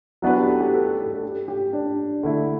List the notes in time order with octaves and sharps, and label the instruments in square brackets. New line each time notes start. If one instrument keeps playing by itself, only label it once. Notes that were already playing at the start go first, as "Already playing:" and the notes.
[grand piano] F#3 B3 D4 F#4 B4 [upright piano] E4
[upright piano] G4
A4
G4
A4
A4
A4
G4
G4
D4
[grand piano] D3 A3 E4